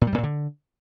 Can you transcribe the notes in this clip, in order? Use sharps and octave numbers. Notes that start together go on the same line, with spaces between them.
A#2
G3
G#2
A#2
D3